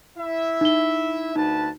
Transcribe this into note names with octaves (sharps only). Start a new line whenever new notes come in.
E4 E5
D#4 G7
D2 D#4 B4 A5